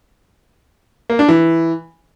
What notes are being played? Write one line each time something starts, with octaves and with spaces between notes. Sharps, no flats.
A#3
D4
E3